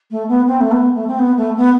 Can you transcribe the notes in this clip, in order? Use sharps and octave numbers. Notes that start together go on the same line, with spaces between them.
A3
B3
C4
A3
B3
A3
C4
B3
A3
B3